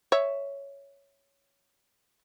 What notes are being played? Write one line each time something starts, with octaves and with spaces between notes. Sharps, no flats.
C#5 E5